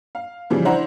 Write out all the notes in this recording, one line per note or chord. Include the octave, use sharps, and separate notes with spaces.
F5
C#3 E3 F3 G3
D4 E4 C5 F#5 A#5